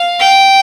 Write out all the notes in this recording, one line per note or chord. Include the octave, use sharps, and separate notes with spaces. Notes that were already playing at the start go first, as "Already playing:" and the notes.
Already playing: F5
G5